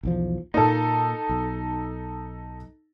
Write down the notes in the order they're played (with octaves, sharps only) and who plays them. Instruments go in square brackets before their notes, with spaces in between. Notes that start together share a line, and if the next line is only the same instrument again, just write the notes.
[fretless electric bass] B1 E2 F3
[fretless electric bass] A#2 A#3 [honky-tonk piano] D#4 A4
[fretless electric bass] B1